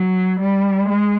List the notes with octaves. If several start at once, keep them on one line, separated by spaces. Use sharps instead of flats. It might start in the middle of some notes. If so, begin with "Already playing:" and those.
Already playing: F#3
G3
G#3